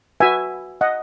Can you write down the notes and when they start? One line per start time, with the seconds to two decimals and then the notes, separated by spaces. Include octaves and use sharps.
0.20 F#4 B4 E5 G#5
0.81 D#5 F#5